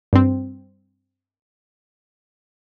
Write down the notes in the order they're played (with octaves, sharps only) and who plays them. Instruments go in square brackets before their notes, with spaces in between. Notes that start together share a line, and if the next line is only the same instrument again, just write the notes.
[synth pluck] G2 C4